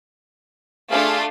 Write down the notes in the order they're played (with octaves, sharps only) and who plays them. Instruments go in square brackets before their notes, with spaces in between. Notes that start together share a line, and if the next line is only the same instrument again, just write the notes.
[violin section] A3 D4 F4 [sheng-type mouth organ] G#4 F5 A5